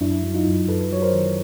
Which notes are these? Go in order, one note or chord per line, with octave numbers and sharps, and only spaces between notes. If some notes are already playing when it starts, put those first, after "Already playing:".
F#2 D4 E4
F#3
D#4 F4
F#2
F#2 A4 B4
F#3 C#5
A#4 C5
D#3